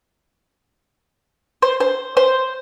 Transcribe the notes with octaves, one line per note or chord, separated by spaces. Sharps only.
C5
C5
C5